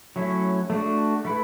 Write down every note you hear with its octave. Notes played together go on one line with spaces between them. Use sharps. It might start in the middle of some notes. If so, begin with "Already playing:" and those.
F#3 A3 C#4 E4
A3 D4 F#4
A3 E4 B4